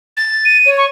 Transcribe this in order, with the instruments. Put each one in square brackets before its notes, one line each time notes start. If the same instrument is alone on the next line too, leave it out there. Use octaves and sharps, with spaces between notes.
[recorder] A6
[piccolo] D#7
[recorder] C#5
[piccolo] C#6